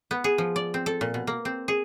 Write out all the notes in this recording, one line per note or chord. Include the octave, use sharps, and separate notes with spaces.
B3
G#4
F3
D5
C4
A4
A#2
B2
A#3
C4
G#4